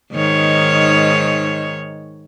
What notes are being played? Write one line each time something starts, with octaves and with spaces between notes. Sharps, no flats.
G#2 D#3 C#5